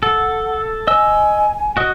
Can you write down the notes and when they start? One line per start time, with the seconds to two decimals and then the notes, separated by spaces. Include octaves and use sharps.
0.03 A4 F#5
0.87 D#5 G#5 E6
1.77 F#4 D#5